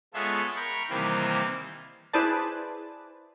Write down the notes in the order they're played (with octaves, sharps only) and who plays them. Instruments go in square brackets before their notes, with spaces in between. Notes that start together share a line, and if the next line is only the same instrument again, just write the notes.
[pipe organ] G#3 B3 F4 A4 C#5 E5
A#4 G5 B5 C#6
C3 D#3 E3 G3 A#3 C4
[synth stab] E4 G#4 B4 C5 D5 A5